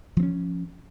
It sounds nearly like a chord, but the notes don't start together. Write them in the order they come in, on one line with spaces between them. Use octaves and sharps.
F3 C4 C#4